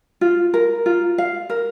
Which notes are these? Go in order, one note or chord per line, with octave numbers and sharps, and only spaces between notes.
F4
A#4
F4
F5
A#4